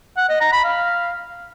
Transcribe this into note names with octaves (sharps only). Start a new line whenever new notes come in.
F#5
D#5
A#5
B5
F5